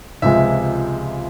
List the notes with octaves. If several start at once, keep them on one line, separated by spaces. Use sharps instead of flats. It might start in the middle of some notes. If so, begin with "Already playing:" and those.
C#2 C3 F3 G#3 E5